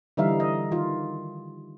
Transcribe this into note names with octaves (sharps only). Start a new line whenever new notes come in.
D3 E3 G3 D#4 E5 F5
D#5
D#3 F4